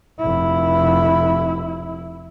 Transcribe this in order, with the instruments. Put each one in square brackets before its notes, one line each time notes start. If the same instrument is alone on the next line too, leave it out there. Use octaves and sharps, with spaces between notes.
[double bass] F1 E4